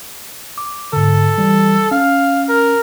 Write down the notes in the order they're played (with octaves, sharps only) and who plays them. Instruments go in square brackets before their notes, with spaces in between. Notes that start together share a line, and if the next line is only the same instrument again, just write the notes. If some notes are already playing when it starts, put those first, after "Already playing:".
[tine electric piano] D6
[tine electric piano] G#2 D3 [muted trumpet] A4
[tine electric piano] E3 G3
[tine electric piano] C#4 [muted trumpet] F5
[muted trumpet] A#4